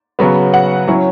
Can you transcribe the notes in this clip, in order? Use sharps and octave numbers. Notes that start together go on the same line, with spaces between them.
C#3 F#3 B3
F#5
F#3 C#4 E4